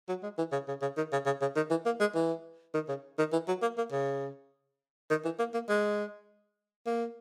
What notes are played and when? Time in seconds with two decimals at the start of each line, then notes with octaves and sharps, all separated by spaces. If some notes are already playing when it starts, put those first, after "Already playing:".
0.08 F#3
0.23 G#3
0.38 E3
0.52 C#3
0.68 C#3
0.82 C#3
0.97 D#3
1.12 C#3
1.26 C#3
1.41 C#3
1.56 D#3
1.70 E3
1.86 A#3
2.00 G#3
2.15 E3
2.74 D#3
2.89 C#3
3.18 D#3
3.33 E3
3.48 F#3
3.62 A#3
3.78 A#3
3.92 C#3
5.10 D#3
5.24 E3
5.39 A#3
5.54 A#3
5.69 G#3
6.86 A#3